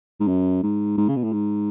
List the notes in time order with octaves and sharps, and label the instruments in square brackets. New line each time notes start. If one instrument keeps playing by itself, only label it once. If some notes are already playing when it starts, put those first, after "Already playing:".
[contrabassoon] G#2
F#2
G#2
G#2
C#3
B2
A2
G#2